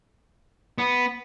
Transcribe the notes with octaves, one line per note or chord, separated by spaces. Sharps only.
B3